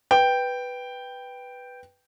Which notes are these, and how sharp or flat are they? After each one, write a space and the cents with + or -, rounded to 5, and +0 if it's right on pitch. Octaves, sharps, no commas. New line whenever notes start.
B4 +0 G5 +0